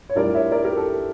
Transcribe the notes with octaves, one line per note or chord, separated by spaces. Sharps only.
C#5
A2 G3 D4 F4 A#4 D5
C#5 E5
A#4 D5
G4 A#4
A4